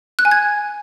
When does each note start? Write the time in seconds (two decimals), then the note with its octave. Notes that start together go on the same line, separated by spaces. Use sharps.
0.19 F#6
0.25 G#5
0.31 G#6